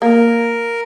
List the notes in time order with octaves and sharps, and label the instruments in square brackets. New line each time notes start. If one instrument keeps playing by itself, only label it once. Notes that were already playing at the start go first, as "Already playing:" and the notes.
[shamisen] A#3 [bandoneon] A#4